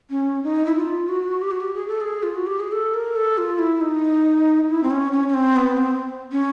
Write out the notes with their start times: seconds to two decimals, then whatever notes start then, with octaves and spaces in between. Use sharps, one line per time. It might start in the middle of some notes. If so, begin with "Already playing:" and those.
0.10 C#4
0.44 D#4
0.66 E4
0.76 F4
1.09 F#4
1.41 G4
1.51 F#4
1.60 G4
1.74 G#4
1.88 A4
2.01 G#4
2.23 F4
2.35 F#4
2.47 G4
2.60 G#4
2.72 A4
2.94 A#4
3.16 A4
3.38 F4
3.59 E4
3.81 D#4
4.69 E4
4.83 C4
4.91 C#4
5.12 C#4
5.28 C#4
5.34 C4
5.56 B3
5.77 C4
6.32 C#4